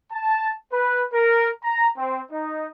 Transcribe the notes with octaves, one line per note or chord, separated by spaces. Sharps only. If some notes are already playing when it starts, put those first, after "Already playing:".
A5
B4
A#4
A#5
C4
D#4